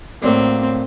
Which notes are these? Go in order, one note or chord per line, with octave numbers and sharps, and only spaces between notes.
A2 F#3 A#3 C4 D4